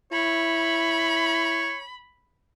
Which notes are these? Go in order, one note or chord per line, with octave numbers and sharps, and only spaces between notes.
E4 C#5 B5